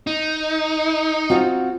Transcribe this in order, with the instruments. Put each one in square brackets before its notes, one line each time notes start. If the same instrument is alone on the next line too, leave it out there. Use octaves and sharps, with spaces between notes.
[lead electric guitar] D#4
[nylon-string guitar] C4 F4 F#4